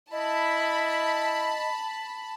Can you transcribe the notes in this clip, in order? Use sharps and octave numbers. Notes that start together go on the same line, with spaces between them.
E4 D#5 A5 B5